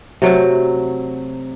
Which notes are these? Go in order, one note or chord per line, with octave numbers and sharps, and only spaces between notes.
C3 F#3 A3